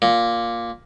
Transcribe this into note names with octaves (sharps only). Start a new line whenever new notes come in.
A#2